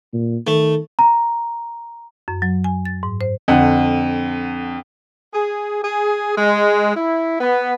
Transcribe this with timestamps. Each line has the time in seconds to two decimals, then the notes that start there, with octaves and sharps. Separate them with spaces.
0.13 A#2
0.47 D#3 A3
0.99 A#5
2.28 F#2
2.42 F#3
2.64 G#5
2.85 A6
3.03 G#2
3.21 C5
3.48 F2 D3 F#5
5.34 G#4
5.83 G#4
6.38 G#3
6.96 E4
7.40 B3